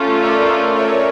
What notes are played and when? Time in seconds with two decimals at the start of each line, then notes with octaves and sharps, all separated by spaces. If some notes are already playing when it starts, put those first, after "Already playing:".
Already playing: A3 C#4 F4 A4
0.21 A#4 D5
0.74 C#5 E5